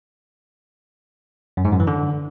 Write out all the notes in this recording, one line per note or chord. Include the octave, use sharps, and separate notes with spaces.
F#2
G#2
F#2
E3
D3